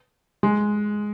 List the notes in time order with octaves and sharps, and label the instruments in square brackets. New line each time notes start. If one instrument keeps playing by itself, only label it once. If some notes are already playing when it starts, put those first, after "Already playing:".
[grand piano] G#3